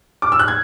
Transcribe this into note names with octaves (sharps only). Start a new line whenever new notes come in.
D6
E6
F#6
G#6